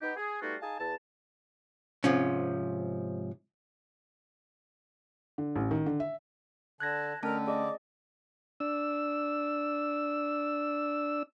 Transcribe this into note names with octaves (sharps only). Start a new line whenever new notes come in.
B3 D#4 G4
G#4
G3 A3 B3 D#4 F4 F#4
D#4 G#4 F5 G#5 A5
E2 A5
G#2 C3 F3 C#4
D3
A1
D#3
D3
E5
D3 A5 F#6 G#6 A#6
D3 A3 C#4 A#4 A5
G#4 D5 D#5 D6
D4 E6